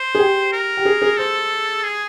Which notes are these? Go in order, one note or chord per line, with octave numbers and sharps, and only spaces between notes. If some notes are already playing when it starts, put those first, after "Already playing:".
Already playing: C5
G#4
G4
A#4
G4
G#4
G#4
A4 C5
G#4